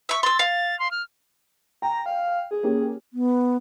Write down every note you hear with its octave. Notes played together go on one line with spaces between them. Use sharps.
E5 C#6
C6 E6 A6
F5
C6
F6
G5 A#5
F5
G#4
A#3 C#4 G4
B3